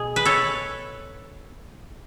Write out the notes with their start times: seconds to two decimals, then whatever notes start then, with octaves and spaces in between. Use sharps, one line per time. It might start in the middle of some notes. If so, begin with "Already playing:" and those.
Already playing: B2 G#4
0.16 B4
0.25 A4 C#5